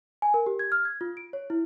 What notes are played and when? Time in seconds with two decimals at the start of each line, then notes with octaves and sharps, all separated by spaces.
0.22 G#5
0.34 A#4
0.46 G4
0.59 G#6
0.72 F6
0.85 G#6
1.01 F4
1.17 D7
1.33 C#5
1.50 E4